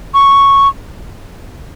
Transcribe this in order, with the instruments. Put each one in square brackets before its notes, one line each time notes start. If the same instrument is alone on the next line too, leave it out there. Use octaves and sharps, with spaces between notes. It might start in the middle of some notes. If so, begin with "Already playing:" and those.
[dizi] C#6